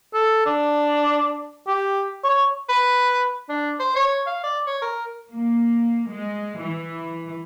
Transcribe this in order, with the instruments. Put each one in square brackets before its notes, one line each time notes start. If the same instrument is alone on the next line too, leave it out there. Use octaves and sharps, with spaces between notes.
[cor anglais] A4
D4
G4
C#5
[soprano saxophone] B4
D4
C5
C#5
F5
D5
C#5
A#4
[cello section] A#3
G#3
E3